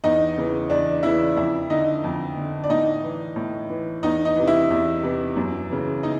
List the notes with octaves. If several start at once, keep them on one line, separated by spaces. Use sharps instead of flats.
E2 D#4 D#5
C#3 E3
E2 D4 D5
C#3 E3 E4 E5
F2 E4 E5
D3 D#4 D#5
F2
D3
D5
A2 D#4 D#5
E3
A2
E3
E2 D#4 D#5
D#4 D#5
C3 E3
E4 E5
E2
C3 E3
F#2
C#3 E3
D#4 D#5